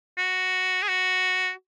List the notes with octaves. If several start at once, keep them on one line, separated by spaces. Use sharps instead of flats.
F#4
G#4
F#4